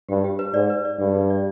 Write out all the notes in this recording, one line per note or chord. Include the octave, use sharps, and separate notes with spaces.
G2 G4
G4
B4
G#2 D5
B4
D5
G2 G#4
G#4
D5